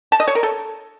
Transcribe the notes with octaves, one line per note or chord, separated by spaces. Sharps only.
A5
D#5
C#5
A#4
A4